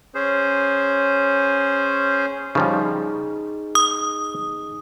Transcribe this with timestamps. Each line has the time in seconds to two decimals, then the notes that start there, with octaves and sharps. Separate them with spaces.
0.15 C#4 G#4 C5
2.55 C#3 F3 G3 D#4 G#4
3.75 D#6